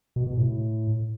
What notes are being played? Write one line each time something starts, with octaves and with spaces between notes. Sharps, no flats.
B2
B2
A2